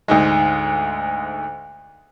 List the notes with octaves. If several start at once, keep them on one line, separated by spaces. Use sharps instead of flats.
D2 G#2 G#3